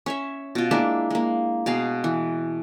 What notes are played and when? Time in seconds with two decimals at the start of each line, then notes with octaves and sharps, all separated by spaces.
0.06 C#4 C#5 E5
0.55 B2 F4
0.71 G#3 A#3 D4 E4
1.10 G#3 A#3
1.66 B2 G#4 F5
2.04 E3